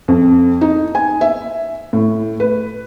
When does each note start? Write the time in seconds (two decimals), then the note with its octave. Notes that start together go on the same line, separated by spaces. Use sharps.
0.08 F2
0.61 D#4
0.95 G#5
1.21 E5
1.93 A2
2.40 B4